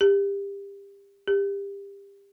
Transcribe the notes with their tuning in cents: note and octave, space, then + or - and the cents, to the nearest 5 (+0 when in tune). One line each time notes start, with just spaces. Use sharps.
G4 +25
G4 +25